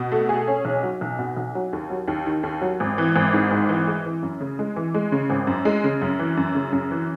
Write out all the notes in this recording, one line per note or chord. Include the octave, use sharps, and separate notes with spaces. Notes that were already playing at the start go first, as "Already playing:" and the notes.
Already playing: B2
A3
G#4
C#4
B1
F#3
B1
B2
B1
F#3
D#2
F#3
D#2
D#3
D#2
F#3
G#1
E3
G#1
G#2
G#1
E3
G#3
E3
F#2
C#3
G#3
E3
G#3
C#3
G#1
F#2
G#3
C#3
F#2
E3
F#2
C#3
F#2
E3